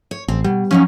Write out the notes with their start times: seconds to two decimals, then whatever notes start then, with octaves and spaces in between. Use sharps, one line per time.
0.11 C#5
0.28 A1 C4
0.44 B2 G3
0.71 F3 F#3 C#4 D#4